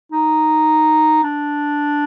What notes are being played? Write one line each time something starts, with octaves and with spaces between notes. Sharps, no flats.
D#4
D4